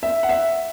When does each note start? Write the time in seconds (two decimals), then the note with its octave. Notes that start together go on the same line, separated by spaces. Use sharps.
0.03 E5
0.23 F#5
0.29 E5